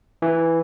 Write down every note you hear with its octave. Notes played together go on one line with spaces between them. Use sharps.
E3